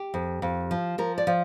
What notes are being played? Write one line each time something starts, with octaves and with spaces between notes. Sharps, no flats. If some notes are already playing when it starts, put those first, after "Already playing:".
Already playing: G4
F2
F2
F3
F3 A#4
D5
F3